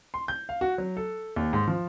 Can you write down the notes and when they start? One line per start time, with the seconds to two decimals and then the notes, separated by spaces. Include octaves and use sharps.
0.14 C6
0.28 G6
0.49 F5
0.61 F#4
0.78 F#3
0.97 A4
1.36 D#2
1.53 G#2
1.68 F3